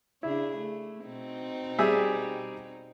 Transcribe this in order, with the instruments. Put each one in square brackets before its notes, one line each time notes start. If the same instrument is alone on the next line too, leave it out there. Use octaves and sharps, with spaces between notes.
[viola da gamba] C#3 D4 G#4 [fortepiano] E4
[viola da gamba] A3
B2 C4 D#4
[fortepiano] G3 G#4 E5